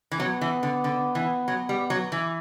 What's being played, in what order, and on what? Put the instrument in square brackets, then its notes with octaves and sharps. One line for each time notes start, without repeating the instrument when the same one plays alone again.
[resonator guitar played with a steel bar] E3
[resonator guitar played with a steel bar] F#3 [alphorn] B3
[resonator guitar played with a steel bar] E3
D3
D3
E3
F#3
G3
F#3
E3